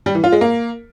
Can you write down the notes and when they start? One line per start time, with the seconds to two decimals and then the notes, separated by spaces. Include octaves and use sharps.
0.06 G3
0.15 E3
0.24 F4
0.32 G#3
0.41 A#3